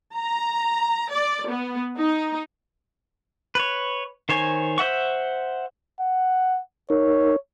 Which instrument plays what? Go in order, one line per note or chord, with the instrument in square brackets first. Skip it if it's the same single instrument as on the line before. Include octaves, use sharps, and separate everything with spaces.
[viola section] A#5
D5
B3
D#4
[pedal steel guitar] B4 C#5
D#3 C5 C#5 G#5
C5 E5 F#5 C#6
[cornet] F#5
[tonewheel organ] D#4 A#4 [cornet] C#5